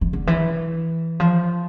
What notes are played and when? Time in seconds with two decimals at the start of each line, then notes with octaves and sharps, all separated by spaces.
0.01 E3
0.13 D3
0.27 E3
1.20 F3